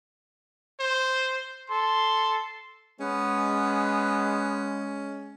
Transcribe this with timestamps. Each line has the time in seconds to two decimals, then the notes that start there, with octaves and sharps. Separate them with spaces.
0.80 C5
1.70 A4 C6
3.00 G#3 B3 C#4